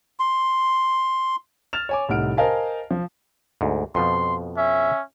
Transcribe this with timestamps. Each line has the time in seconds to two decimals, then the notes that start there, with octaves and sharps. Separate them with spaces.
0.20 C6
1.73 F6 A6 E7 F7
1.89 C#5 G#5 D6
2.09 C2 A2 D#4 F#5 F6 D7
2.37 A#4 C5 D#5 F5 G#5 A5
2.91 F3
3.61 D2 G#2
3.95 F2 B2 F3 C6
4.57 C#4 E5